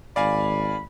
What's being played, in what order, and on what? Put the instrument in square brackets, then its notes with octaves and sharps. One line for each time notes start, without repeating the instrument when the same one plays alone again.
[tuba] G#1 [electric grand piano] D5 F5 G#5 [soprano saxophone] B5